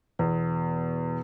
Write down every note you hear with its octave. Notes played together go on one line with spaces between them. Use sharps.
E2 B2